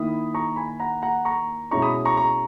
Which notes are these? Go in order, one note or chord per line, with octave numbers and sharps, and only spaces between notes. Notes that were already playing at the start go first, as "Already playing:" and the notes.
Already playing: D#3 A#3 E4 B5 D#6
A#5 C#6
G#5 B5
F#5 A#5
F#5 A#5
A#5 C#6
B2 G#3 C#4 E4 A#5 C#6
B5 D#6
A#5 C#6
A#5 C#6